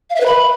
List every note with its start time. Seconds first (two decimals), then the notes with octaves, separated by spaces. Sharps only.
0.10 F5
0.15 E5
0.21 B4
0.26 B5